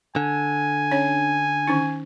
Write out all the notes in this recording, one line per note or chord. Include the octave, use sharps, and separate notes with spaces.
D3 G#5
C#4 D4 C#5
D#3 C#4 D#4